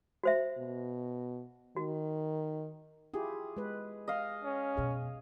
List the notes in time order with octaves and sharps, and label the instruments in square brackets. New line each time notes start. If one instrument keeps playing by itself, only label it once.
[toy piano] F#4 C5 E5
[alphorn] B2
[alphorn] D#3 [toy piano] F#4
[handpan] E4 F4 G4 [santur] G#4
[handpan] G#3 B4
[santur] D#5 F5
[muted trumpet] C#4
[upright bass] F#2 B2 [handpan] G#4